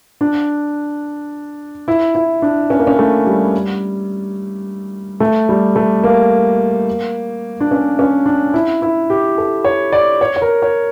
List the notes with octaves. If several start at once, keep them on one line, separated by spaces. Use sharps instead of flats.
D4
E4
E4
D4
C#4
A#3
C#4
A3
G3
A3
G3
A3
A#3
D4
C#4
C#4
D4
E4
E4
G4
A4
C#5
D5
C#5
C#5
A#4
C#5